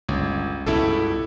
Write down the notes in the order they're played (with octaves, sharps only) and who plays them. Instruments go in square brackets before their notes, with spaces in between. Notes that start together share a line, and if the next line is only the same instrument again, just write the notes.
[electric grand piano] G1 [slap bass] C#2
[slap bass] C#2 G2 B2 [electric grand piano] E4 A4